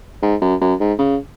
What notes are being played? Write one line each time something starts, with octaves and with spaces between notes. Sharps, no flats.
G#2
F#2
F#2
G#2
C#3